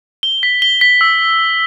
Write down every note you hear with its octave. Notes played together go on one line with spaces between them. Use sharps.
G7
B6
G7
B6
E6